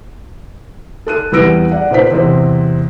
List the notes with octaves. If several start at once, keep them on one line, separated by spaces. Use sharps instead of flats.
A4 F#6 D#7
E2 G3 B4 E6 A#6 D7
D5 F#5
A#2 B4 C5 B6
E2 C3 C4